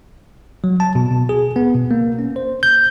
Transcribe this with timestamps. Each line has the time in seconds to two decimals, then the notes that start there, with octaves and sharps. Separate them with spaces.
0.64 F#3
0.80 A5
0.95 B2
1.11 B2
1.29 G#4
1.56 B3
1.75 B2
1.91 A#3
2.19 C#4
2.36 C5
2.63 G6